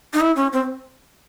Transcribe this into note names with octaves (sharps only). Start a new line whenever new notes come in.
D#4
E4
C#4
C4